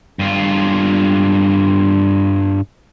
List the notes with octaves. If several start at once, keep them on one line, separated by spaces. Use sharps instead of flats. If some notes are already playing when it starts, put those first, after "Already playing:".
G2 F4